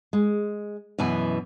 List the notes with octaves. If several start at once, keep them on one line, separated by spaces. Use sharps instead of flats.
G#3
F#2 B2 E3 G#5